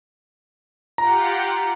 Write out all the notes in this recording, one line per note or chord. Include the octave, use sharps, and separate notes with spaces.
F4 G4 F#5 A#5